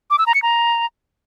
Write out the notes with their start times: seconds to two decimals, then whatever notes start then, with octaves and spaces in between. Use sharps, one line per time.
0.10 D6
0.18 E6
0.26 A#5
0.34 C#7
0.42 A#5